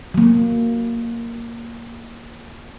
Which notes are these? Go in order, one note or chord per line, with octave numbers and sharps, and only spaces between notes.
F#3 A#3